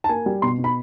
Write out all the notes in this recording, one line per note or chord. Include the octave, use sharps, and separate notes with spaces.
A5
A#3 G#5
G3
B2 C6
B2
B5